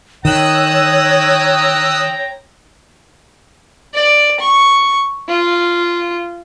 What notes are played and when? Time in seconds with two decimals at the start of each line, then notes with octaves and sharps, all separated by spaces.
0.25 D#3 C#5 G5 A#5 D#6 E6 F#6
3.95 D5
4.40 C#6
5.29 F4